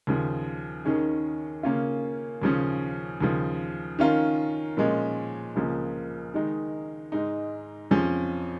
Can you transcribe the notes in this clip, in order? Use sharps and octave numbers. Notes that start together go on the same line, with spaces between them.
D#2 C#3 F3
D#2 D#3 C#4 G#4
C#3 A#3 C#4 F4
D#2 C#3 F3 C#4
D#2 C#3 F3
D#3 C#4 F4 A#4
A#2 F3 G#3 C#4
C#2 C#3 F3 A#3
D#3 G#3 D#4
G#2 G#3 D#4
F2 F3 C#4 G#4